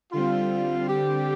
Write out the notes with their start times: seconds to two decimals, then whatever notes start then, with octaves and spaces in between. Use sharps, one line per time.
0.13 D3 G3 C4 F4
0.89 G4